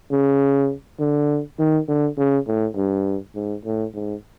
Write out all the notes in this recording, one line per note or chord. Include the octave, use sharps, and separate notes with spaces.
C#3
D3
D#3
D3
C#3
A2
G2
G#2
A2
G#2